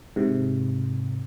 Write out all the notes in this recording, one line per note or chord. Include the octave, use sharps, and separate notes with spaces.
G#2 C3